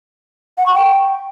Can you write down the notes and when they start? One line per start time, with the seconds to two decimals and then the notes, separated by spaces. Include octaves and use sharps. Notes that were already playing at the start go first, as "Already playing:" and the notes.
0.58 F#5
0.66 C#6
0.74 G5